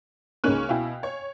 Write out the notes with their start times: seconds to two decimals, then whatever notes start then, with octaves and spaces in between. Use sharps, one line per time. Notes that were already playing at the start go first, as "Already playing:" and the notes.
0.44 C#2 A#3 C#4 D#4 F#6
0.69 B2 E4 F5 G5 G#5
1.03 C#5